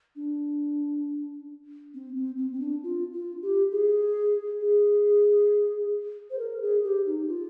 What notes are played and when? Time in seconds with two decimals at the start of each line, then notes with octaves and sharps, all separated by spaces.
0.16 D4
1.94 C4
2.16 C4
2.38 C4
2.53 C4
2.60 D4
2.83 F4
3.13 F4
3.42 G4
3.72 G#4
4.60 G#4
6.31 C5
6.39 A#4
6.62 G#4
6.84 G4
7.06 D#4
7.28 F4